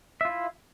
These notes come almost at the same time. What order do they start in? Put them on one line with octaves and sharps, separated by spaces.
E5 F4 E4